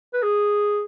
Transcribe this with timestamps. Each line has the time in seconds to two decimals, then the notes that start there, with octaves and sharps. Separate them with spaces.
0.13 B4
0.22 G#4